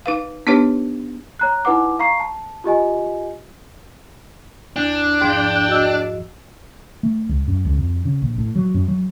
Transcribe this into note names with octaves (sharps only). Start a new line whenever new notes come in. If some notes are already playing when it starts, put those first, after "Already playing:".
D#4 B4 F5
B3 D4 D#4 G4 B4 C#5
C#5 A#5 F#6
D#4 E4 B4 F#5 D6
F5 A#5 C#6 C7
A5
F4 G4 D#5 G#5
E2 D4
G#2 F3 G5
F#4 D#5 E6
A3
C#2
F#2
C#2
F2
C#3
A#1
A2
F#3
F#2
F#3